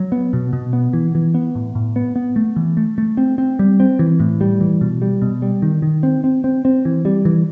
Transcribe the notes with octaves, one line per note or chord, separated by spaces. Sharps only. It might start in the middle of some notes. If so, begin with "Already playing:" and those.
Already playing: F#3
B3
B2
B2
B3
E3
E3
B3
A2
A2
B3
B3
A3
E3
A3
A3
C4
C4
G3
C4
E3
A2
G3
E3
B2
G3
B2
G3
D#3
D#3
C4
C4
C4
C4
E3
G3
E3